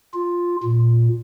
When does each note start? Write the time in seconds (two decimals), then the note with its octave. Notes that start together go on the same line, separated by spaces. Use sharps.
0.14 F4
0.63 A#2